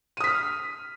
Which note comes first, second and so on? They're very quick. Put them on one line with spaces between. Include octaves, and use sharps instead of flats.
D#7 D#6 B6 F6